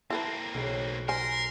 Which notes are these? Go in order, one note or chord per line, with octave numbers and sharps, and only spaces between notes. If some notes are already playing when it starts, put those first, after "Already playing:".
A#3 C4 E4 A4 B4
B1
A#4 C5 G#5 C6